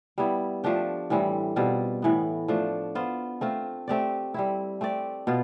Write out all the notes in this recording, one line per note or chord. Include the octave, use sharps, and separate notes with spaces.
G3 B3 E4
F3 A3 D4 G4
A2 E3 G3 C4
B2 G3 C4 F4
A2 E3 B3
F3 A3 D4
B3 F4 C5
A3 C4 F4
A3 C4 G4 D5
G3 C4 E4
A3 C4 G4 D5
B2 B3 F4